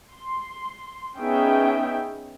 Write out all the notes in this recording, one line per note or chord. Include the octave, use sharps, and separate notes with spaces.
C6
B3 C#4 D#4 G#4 E5 G5